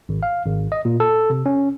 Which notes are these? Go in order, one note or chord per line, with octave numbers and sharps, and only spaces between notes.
G#1
F5
G#1
D#5
A#2
A4
C3
C#4